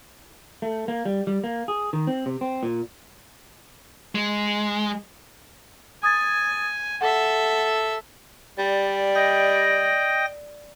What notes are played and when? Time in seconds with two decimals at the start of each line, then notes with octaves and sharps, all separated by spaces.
0.62 A3
0.88 A#3
1.05 G3
1.27 G3
1.44 A#3
1.68 G#4
1.93 D#3
2.07 C4
2.26 C3
2.41 C4
2.63 A#2
4.15 G#3
6.03 G#5 D#6 G#6 A6
7.01 A4 E5 F#5
8.59 G3 D5
9.15 D#5 G5 A#6